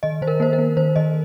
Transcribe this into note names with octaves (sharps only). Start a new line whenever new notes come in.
D#3 D#5
D#3 C5
A#4
A#3 C5
A#4
A#3
D#3 C5
D#3 D#5